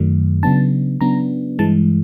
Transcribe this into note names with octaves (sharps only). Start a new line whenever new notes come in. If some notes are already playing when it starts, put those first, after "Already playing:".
Already playing: F#2 D#3 F#3 A3
C#3 F#3 B3 D4 A5
C#3 F#3 B3 D4 A#5
G2 E3 G#3 A5